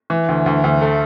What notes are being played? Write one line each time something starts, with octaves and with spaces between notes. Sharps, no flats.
E3
D2
D2
D2
A3